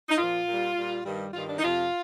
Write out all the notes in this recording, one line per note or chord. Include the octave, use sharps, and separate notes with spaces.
D#4
A#2 F3 F4
A#2 G3
A#2 G3
G2 D#3 G3
G2 D#3 G3 F4
D4
D#4
F2 C3 F3 F4